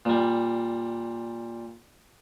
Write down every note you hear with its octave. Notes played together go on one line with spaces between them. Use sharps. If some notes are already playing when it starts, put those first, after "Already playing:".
A#2 G3